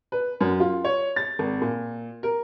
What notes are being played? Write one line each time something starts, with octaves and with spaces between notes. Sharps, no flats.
B4
F#2
F4
C#5
A6
G#1
A#2
A#4